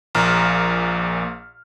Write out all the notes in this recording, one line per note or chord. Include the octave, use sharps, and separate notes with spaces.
A#1 A#2 A#5 F6